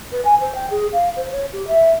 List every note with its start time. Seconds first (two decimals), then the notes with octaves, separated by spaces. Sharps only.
0.12 B4
0.25 G#5
0.40 C5
0.55 G5
0.71 G#4
0.93 F5
1.16 C5
1.32 C#5
1.53 G4
1.68 E5